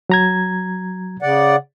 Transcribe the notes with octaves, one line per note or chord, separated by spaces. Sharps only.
F#3 A#5 G#6
C#3 D5 F#5